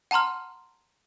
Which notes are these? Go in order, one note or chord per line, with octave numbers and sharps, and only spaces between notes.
F#5 A5 A#5 C6 F6